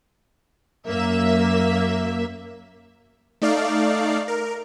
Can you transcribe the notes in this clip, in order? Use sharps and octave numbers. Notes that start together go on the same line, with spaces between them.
F#2 A#3 E5
A3 D#4 D5 F5
A#4